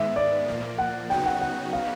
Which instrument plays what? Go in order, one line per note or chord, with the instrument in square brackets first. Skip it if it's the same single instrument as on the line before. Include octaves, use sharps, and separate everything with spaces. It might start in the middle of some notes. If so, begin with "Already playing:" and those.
Already playing: [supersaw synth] G#2 D#3 G#3 B3 [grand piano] E5
[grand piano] D5
[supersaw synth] A#2 F3 A#3
[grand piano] F#5
[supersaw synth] C#3 F#3 B3 D#4 F#4 [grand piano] G5
[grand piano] F#5
F#5
F5